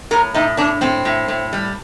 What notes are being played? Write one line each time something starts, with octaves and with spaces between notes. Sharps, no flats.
A2 A#4
A2 D#4
A2 D4
A2 C4
A2
A2
G3